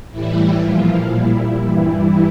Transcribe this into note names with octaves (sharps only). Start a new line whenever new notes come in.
A2 E3 G3 E4
A#2 F3 F4
A#2 G3 E4
G2 E3 G3 E4